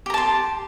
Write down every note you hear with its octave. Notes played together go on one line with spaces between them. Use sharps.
G4 A5 A#5 C6